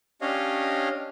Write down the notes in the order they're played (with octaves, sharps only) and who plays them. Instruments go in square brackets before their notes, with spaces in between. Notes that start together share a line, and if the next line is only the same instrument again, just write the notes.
[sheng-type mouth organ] C#4 D4 G4 C#5 D#5 F5